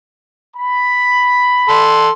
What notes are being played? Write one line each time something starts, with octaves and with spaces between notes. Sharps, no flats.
B5
A4 C6